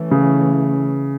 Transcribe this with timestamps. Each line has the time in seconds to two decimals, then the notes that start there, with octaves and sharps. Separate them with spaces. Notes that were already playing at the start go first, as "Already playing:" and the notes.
Already playing: E3 A3 C#4
0.11 C#3